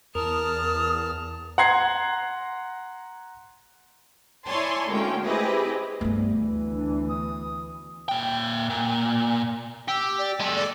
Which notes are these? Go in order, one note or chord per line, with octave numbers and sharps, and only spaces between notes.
E2 A#4 A5 D#6 F6
F#5 A#5 C6 G#6 C7
E4 C#5 D5 G#5 A5 C6
D2 G#3 A#3 C#4 G5
C4 E4 G4 G#4 B4 D#5
G2 A3 B3
D2 E3
D4
D#6
A#2 G5
A#2
G4 E6
D5
G#3 A4
D5